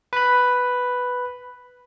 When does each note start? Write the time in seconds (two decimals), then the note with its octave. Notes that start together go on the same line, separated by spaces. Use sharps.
0.13 B4 B5